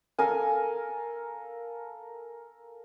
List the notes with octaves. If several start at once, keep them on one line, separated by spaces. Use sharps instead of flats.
A4 A#4 F5 G#5